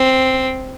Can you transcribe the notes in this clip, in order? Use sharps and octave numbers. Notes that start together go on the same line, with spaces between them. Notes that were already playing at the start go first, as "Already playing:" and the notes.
Already playing: C4